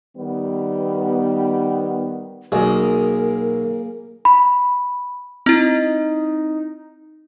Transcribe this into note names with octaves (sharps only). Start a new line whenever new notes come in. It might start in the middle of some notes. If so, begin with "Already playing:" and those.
D#3 G3 B3
B1 A#3 G#4 A#4
B5
C4 D#4 E4